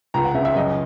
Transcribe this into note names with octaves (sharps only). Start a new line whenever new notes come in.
C#2 A#5
F#5
C#3 E5
E5
F#2 D#5